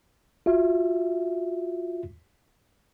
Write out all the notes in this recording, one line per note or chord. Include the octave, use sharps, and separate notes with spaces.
F4 F#4 E5